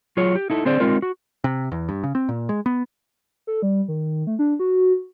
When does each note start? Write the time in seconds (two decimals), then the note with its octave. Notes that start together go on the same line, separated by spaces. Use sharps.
0.17 F#3 F4 G#4 C#5
0.35 G4
0.50 D#4 E4 A4
0.65 D3 C4 G#4 C5 D5
0.80 G#3 C4 D#4 F4 A#4
1.02 F#4
1.44 C3
1.72 E2
1.89 G2
2.03 C#3
2.15 C4
2.29 A#2
2.49 G#3
2.66 B3
3.47 A4
3.62 G3
3.88 D#3
4.27 A3
4.39 D4
4.59 F#4